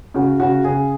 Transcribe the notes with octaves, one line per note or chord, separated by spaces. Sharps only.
C#3 F#4
C#3 F#4
C#3 G#4